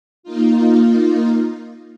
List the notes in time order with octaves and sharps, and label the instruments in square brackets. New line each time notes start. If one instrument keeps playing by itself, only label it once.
[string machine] A#3 D#4 F4